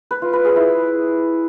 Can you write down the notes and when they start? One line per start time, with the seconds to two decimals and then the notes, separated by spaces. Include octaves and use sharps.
0.11 B4
0.22 F4
0.33 B4
0.45 G#4
0.56 E4